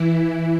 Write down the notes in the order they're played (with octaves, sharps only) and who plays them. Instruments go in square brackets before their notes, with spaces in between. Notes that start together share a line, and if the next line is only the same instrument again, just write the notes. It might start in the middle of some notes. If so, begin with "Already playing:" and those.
Already playing: [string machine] E3 E4